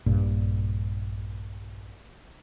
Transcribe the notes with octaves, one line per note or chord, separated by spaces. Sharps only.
A#1 G2 A#2